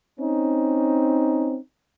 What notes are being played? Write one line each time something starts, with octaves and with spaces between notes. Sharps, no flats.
C4 C#4 D#4